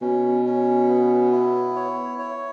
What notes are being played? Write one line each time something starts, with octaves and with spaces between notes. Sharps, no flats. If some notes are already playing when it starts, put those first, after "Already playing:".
B2 C#4
C#4
B3
E4
C#5
C#5